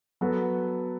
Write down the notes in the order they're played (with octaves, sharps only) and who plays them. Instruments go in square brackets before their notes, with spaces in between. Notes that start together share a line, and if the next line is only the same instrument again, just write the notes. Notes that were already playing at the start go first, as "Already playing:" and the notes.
[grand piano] F#3 B3 F#4 A4